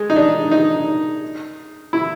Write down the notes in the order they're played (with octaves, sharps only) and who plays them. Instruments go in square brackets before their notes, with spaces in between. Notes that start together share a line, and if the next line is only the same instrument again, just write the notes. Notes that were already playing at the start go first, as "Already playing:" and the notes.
Already playing: [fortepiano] G#3
D#4
D4
D#4
E4